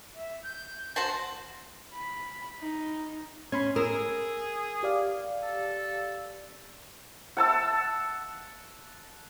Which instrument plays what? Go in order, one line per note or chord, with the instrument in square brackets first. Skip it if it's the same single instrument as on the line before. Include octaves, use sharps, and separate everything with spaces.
[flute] E5
G6
[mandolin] F#4 C5 A5
[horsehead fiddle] B5
D#4
[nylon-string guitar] C#4 [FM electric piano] B5 C6 G#6
[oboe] G#4 [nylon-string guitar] A#4 [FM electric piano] E6
[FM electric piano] G4 D5 F5
[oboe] A4
[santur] F#5 A5 E6